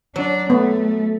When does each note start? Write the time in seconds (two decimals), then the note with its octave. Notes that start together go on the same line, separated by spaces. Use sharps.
0.16 F#3 D4
0.50 A3 B3